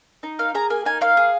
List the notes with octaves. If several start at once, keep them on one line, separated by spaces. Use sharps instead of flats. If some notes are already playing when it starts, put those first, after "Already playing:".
D#4
A#3 F5
G#4 A#5
A#3 G#5
D#4 G#5
A#3 F5
G#4